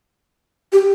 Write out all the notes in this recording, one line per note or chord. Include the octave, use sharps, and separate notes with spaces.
G4